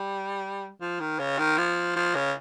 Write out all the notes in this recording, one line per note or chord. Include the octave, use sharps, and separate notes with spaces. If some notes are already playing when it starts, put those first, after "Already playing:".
Already playing: G3
F3
D#3
C#3
D#3
F3
F3
C#3